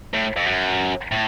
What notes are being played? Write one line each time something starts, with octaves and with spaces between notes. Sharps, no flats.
A2
F2
F#2
A2